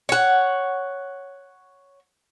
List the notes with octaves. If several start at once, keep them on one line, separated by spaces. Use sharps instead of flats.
C#5 F#5